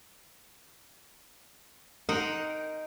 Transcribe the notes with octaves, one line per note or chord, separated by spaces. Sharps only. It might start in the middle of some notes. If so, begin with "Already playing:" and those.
D#4 A#4 C5 F#5 G5